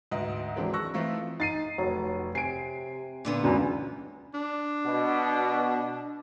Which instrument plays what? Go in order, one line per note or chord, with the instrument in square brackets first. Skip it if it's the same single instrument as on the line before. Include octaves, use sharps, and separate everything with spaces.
[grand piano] D2 G#2 B4 D#5
D#3 E3 F#3 G#3 C4 D4
A5 C#6 E6 F#6 A#6
E3 A3 C4 D#4 F4
[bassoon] D#4 [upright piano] A6 C7 D#7
[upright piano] F1 [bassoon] F#3 [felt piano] C#5
[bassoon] C3 [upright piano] G#5 D7 [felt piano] C7
[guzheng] A#2 D3 B3
[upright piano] C#2 F#2 [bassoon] E3 [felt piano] C#4 G#5 B5
[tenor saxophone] D4
[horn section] B2